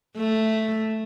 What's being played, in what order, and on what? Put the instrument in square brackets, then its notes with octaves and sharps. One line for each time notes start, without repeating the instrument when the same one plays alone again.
[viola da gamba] A3